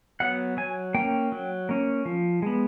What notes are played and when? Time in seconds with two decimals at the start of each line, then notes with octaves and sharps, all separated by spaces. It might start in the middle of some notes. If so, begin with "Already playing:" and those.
0.20 F#3 B3 F#5
0.57 F#3 G#5
0.94 A#3 C#4 G5
1.32 F#3
1.69 A#3 C#4
2.05 F3
2.42 G#3 B3